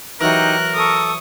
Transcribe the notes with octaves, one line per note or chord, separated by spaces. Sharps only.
E3 F#3 D#4 G4 A#4 F#6
A4 C#6 D#6